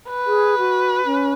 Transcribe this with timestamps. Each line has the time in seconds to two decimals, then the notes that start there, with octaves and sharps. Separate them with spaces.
0.10 B4
0.26 G#4
0.58 F#4
1.05 C#4